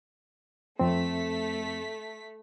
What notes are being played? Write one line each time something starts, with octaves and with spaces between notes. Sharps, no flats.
F2 A3 C4 B6